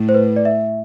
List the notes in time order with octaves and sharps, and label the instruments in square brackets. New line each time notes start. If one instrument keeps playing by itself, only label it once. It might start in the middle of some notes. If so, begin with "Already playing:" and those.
Already playing: [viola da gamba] A2
[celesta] C5
B4
D5
E5